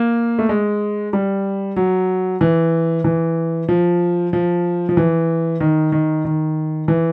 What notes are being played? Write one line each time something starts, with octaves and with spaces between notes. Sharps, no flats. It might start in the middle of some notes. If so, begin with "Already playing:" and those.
Already playing: A#3
A3
G#3
G3
F#3
E3
E3
F3
F3
F3
E3
D#3
D#3
D#3
E3